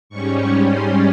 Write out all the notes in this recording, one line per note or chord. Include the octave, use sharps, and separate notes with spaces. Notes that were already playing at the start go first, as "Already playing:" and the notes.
G#2 G3 C#4 C#6
C#6
C6